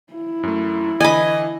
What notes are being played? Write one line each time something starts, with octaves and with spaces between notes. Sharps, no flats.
E4
F#2 A3
D3 E3 D#5 G#5 B5